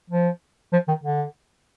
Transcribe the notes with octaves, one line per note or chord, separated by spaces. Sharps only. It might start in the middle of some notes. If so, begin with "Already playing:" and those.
F3
F3
D#3
D3